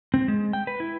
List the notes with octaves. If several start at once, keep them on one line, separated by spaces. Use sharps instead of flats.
C4
G#3
G5
B4
E4